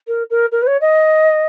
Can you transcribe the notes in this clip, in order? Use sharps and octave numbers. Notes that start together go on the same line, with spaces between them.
A#4
A#4
A#4
B4
C#5
D#5